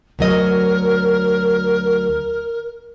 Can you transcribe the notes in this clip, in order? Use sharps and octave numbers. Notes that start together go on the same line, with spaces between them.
D2 F#3 A#4 D#5